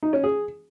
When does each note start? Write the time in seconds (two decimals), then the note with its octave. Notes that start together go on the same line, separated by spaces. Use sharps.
0.03 D#4
0.13 C#4
0.24 G#4